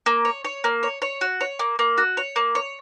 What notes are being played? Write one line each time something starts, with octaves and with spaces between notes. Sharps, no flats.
A#3
C#5
C#5
A#3
C#5
C#5
F#4
C#5
A#3
A#3
F#4
C#5
A#3
C#5